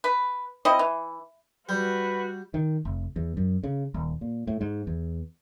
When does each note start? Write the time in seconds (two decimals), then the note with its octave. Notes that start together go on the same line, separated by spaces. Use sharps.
0.04 B4
0.65 C4 E4 F#4 D#5
0.79 E3
1.69 G3 F#4 B4
2.54 D#3
2.85 F1
3.16 E2
3.37 F#2
3.63 C#3
3.94 D#1
4.21 A#2
4.47 A2
4.61 G#2
4.87 E2